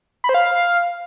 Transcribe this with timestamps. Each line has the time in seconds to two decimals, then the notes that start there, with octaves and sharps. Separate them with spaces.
0.24 B5
0.29 C5
0.34 F5